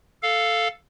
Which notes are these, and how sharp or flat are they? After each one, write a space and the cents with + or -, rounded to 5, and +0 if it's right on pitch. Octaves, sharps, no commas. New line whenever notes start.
A4 +0 F5 +0